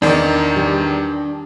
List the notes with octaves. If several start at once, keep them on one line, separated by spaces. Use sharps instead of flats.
E2 D#3 D4 D#4 D5
G3 G4